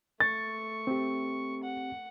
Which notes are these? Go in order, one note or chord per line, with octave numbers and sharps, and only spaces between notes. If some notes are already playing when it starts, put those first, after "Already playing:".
A3 C#6 A6
C4 G4
F#5